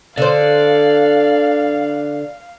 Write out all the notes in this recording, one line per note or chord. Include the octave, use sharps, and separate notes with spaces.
D3 C5 D5 F5